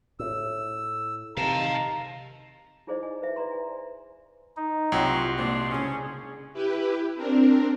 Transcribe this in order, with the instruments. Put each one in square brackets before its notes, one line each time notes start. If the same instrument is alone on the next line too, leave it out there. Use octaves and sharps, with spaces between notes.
[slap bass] A2 [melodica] E6
[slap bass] C3 D#3 [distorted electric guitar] F5 A5 [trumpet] A#5
[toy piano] D#4 E4 G#4 C5 D5 D#5
G#5
B4 C5 E5
B4 D5 E5 A#5 C6
G#5
[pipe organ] D#4
[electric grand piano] C2 [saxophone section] F#3 [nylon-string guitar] B3 F4 G5 [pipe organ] C6
[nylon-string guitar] A#2 G#3 F#4 [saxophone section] C4 D4
[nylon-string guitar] C#3 D4 [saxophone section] C#4 [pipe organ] G#4
[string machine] E4 G4 B4
C4 D4 A#4